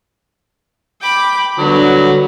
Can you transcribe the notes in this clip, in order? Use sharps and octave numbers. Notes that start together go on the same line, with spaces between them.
G5 B5 D6
D3 F#3 G3 B3